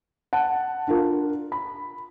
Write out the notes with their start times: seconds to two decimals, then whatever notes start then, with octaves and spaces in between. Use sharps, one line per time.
0.33 F#5 A5
0.87 D4 F4 A#4
1.52 B5